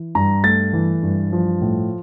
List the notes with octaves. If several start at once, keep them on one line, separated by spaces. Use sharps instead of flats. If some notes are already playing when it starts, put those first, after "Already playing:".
Already playing: E3
G2 A#5
A3 A6
E3
G2
F3
A2